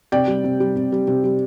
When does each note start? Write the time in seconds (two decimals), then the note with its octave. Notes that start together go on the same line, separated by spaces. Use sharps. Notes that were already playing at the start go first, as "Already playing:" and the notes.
0.12 C3 D5 G5
0.28 G3
0.44 C3
0.60 G3
0.76 C3
0.92 G3
1.08 C3
1.24 G3